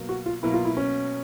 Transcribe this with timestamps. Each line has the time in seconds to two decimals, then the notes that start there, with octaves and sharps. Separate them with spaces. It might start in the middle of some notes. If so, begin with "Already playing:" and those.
Already playing: B2 F#3 A#3
0.09 F#4
0.26 F4
0.43 B2 F#3 A#3 E4
0.53 F4
0.65 E4
0.77 C#4